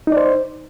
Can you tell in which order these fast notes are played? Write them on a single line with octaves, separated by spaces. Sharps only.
D#4 D5 C5